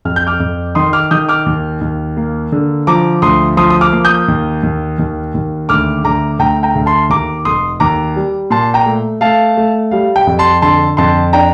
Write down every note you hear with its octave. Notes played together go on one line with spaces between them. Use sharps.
F2 F6
G6
D6 F6
F2
D#3 C6 D#6
D6 F6
D#3 D#6 G6
D6 F6
D#2
D#2
A#3
D3
F3 A#5 D6
D2 C6 D#6
F3 C6 D#6
D#6
D6 F6
A#3
D#6 G6
D#2
D#2
D#2
D#2
D2 D6 F6
D2 A#5 D6
D2 G5 A#5
G5 A#5
D2
A5 C6
D#2 A#5 D6
F1 C6 D#6
D#2 A#5 D6
G3
A#2 A5 C6
G5 A#5
A3
A3 F5 A5
A3
G3 F5
G5
F2
A5 C6
D3 A5 C6
F2 A5 C6
D4 G5 A#5